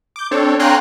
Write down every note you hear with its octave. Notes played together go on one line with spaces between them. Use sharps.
D6 G6
C4 D4 A4 C#5
F5 G5 G#5 A#5 C6 F#6